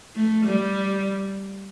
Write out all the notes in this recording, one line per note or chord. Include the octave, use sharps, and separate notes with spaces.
A3
G3